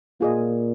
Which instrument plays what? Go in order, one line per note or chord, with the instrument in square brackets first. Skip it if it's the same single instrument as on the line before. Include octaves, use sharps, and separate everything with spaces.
[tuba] A#2 [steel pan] F4 G#4 D#5